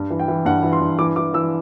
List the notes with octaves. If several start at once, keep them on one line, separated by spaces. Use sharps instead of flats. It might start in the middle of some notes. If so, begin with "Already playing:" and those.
Already playing: G2
E3
G5
E3
G2 F#5
E3
C6
G2
E3 D6
E3 D6
E3 E6